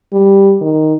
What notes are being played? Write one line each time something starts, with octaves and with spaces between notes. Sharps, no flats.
G3
D#3